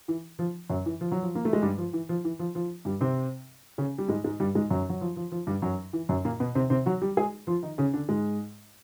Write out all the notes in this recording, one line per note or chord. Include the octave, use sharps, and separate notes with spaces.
E3
F3
F#2 F#3
E3
F3
F#3
F3
A#3
A3
G#3
G2 G3
F3
E3
F3
E3
F3
F3
G2 G3
C3 C4
C#3 C#4
G3
G#2 G#3
G#2 G#3
G2 G3
G#2 G#3
F#2 F#3
F#3
F3
F3
F3
G2 G3
F#2 F#3
E3
F#2 F#3
A#2 A#3
B2 B3
C3 C4
C3 C4
F#3 F#4
G3 G4
G#3 G#4
F3 F4
D#3 D#4
C#3 C#4
D3 D4
G#2 G#3